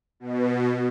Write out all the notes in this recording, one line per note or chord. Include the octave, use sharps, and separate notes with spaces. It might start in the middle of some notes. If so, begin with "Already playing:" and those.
B2